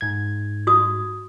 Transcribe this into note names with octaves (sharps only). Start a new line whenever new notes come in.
G#2 G#6
F#4 D#6